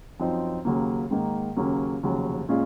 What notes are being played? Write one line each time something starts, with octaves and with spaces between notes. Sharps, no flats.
F#2 F3 C4 D#4
D#2 C#3 F#3 A#3
G#2 D#3 A#3
D#2 C#3 F#3 A#3 C#4
F1 D#2 C#3 F#3
A#2 G#3 C#4 F4